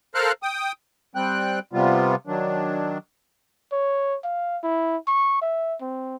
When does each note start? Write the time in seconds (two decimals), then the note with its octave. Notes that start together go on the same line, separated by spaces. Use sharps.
0.15 A4 A#4 C5 F5 F6 F#6
0.43 G5 D#6
1.15 G3 C4 G5 F#6
1.73 C3 G3 B3 F4
2.27 D#3 F#3 D4
3.73 C#5
4.24 F5
4.63 E4
5.07 C#6
5.42 E5
5.81 C4